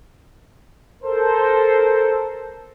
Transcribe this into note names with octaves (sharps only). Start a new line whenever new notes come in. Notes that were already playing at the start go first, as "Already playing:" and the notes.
A4 A#4 C5